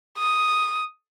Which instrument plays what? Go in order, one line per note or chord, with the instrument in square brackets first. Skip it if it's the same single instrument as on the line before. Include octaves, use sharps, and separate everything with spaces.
[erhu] D#6